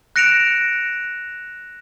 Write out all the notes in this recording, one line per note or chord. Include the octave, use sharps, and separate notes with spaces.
F#6 A#6 C#7 D7 E7 F7